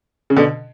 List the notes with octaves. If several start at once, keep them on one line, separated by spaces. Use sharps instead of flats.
C#3
B2 D3